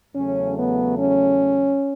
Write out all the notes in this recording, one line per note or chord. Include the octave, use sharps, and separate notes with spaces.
E2 C#3 F#3 A3 C#4
B3
C#4